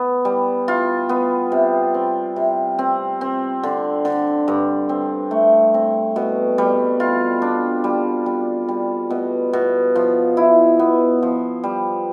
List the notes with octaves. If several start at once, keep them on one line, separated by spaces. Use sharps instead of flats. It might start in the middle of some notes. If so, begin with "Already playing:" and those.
Already playing: B3
G3
F4
B3
C3
C4
C3
C4
C4
D3
D3
G2
C4
A3
C4
B2
G3
F4
D4
G3
G3
G3
B2
B2
F3
E4
B3
F3
G3